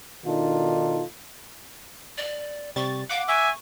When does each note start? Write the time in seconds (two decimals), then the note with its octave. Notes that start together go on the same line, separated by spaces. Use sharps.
0.25 B2 D#3 D4 D#4 F4 A4
2.18 D5
2.76 C3 G3 C#6 A6
3.09 F5 F#5 D6
3.28 E5 G#5 C#6